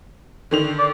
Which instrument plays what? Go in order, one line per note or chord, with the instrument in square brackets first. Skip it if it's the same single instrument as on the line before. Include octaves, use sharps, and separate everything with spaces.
[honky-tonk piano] D3 D#3 F7
[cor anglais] D5